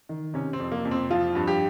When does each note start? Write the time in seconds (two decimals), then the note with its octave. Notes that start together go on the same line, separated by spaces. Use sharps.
0.09 D#3
0.34 C3 C#4
0.53 C4
0.60 F2
0.72 A#3
0.85 F2
0.91 C4
1.10 F3 F4
1.35 G2
1.47 G4